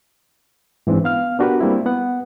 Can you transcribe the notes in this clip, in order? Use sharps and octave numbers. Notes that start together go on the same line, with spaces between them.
G#2 E3 C4 D4
B3 F5 F6
B3 D4 F#4 G4 A#4 B4
G3 A#3 C4 E4
B3 F#5